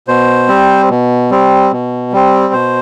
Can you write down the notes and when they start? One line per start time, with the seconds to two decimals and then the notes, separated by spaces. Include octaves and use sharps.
0.08 B2 C5
0.48 G3 C4
0.90 B2
1.31 G3 C4
1.72 B2
2.12 G3 C4
2.53 B2 C5